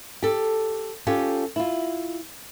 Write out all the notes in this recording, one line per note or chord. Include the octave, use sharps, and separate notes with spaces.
G4 A4
C#4 F4 G4 A4
E4 F4